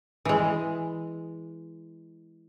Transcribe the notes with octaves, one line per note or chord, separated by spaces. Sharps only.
E3 G#3